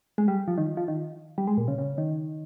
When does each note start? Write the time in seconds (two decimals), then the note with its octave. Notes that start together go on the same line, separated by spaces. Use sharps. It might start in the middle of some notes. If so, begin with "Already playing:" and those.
0.18 G#3
0.28 G3
0.48 F3
0.58 D#3
0.77 F3
0.88 D#3
1.38 G3
1.47 G#3
1.58 A#2
1.68 C#3
1.78 C#3
1.98 D#3